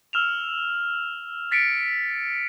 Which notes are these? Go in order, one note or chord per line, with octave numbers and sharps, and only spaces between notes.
E6 F6 E7 F7
A6 B6 C#7 D7